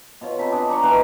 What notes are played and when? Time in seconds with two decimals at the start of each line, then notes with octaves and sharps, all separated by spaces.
0.21 B2 F4 C#5
0.39 C3 A4 B5
0.52 D4 G#4 B4 D5
0.70 A#5 C6 C#6
0.83 D#3 E3 B3 B4